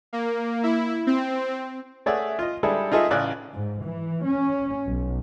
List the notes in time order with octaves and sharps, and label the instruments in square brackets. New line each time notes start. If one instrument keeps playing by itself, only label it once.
[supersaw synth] A#3
E4
C4
[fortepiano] A3 G#4 C#5 D5 E5 F#5
F4 D#5
G3 G#3 D4 E4 G#4 A4
D#4 F4 G#4 A4 D#5 E5
A1 C#3 D5 G#5 F#6
[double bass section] G#2
E3
C#4
B1